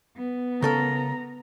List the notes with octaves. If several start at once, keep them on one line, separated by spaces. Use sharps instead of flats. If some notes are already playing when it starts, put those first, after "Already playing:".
B3
C#3 A4 A#4 A#5